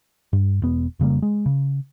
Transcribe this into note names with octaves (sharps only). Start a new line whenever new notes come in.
G2
E1 B3
F1 C#3 G3 A#3
G#3
C#3